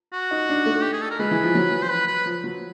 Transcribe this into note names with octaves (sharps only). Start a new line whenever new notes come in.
F#4
D#4
D4
A3
G4
G#4
A4
A#4
G#3 B4
E3
F3
F#3
C5
B4
B4
F3
F#3